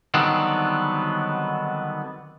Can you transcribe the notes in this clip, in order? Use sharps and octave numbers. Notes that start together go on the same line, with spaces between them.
D3 D#3 F#3 G3 B3 C4